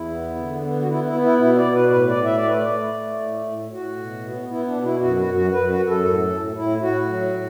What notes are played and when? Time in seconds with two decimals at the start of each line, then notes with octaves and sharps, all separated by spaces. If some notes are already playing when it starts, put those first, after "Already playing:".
Already playing: E2 E4
0.10 B3
0.36 D3
0.61 B3
0.81 F#4
0.87 B3 E4
1.04 E4
1.13 B3
1.22 E4
1.38 B2 E4
1.57 D5
1.65 B2
1.73 B4
1.90 A2 B4
2.08 D5
2.16 A2
2.25 E5
2.36 D5
2.43 A3 B4
2.57 D5
2.68 A3
2.93 A3
3.20 A2
3.45 A2
3.71 A2 F#4
3.97 B2
4.23 B3
4.49 B3 E4
4.66 D4
4.75 B2
4.83 E4
5.00 F#2 F#4
5.17 F#4
5.27 F#2
5.35 F#4
5.52 F#2 B4
5.69 F#4
5.79 F#2
5.87 A4
6.05 A2
6.30 A2
6.56 A2 E4
6.81 A2 F#4
7.07 F#3
7.34 A2